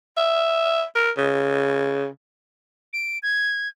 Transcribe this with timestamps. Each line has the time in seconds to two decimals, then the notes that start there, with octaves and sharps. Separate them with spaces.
0.17 E5
0.95 A#4
1.17 C#3
2.93 D7
3.23 G#6